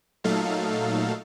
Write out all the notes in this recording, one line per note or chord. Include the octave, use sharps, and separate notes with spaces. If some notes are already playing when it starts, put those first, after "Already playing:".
A#2 F#3 A3 D#4 A4 F5